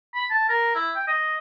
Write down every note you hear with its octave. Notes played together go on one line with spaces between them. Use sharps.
B5
A5
A#4
E4
G5
D#5